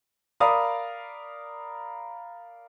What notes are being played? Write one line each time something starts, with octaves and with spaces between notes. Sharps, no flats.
A#4 D5 F5 B5 D#6